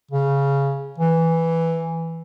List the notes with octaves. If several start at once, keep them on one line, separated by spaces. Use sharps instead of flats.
C#3
E3